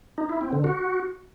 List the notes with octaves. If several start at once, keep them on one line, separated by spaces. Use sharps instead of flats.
D#4
E4
C4
D3
F#4